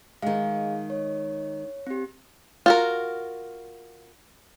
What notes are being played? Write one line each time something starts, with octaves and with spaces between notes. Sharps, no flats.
D#3 G#3 G#4 F5
C#5
C4 G4
F4 F#4 A#4